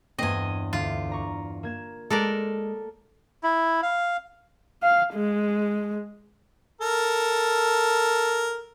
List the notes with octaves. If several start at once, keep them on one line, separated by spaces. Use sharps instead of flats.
E2 G2 C4 D#5 G#5 D#7
D2 F4 D#7
D5 A#5 C#6
A#3 G#6 E7
G#3 A4 A#4 D5
E4
F5
F5
G#3
A4 A#4